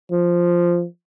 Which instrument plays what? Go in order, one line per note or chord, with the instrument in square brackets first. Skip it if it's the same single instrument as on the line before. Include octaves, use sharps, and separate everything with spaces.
[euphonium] F3